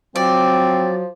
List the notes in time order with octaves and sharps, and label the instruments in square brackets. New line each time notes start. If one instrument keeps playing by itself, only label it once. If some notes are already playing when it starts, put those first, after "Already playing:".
[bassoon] F3 [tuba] F#3 [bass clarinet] C4 [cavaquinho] D5